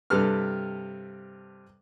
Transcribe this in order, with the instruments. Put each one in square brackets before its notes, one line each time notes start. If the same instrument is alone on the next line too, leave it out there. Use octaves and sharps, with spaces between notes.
[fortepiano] G2 C3 A4 B4 F6